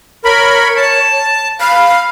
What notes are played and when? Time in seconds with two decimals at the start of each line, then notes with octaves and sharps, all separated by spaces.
0.25 A#4 C#5 B5
0.77 A5
1.60 F5 B5